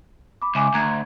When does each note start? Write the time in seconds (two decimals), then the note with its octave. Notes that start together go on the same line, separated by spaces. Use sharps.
0.42 B5 D6
0.55 C#2 E5 G#5 D6
0.74 D2 A#5 F#6 G#6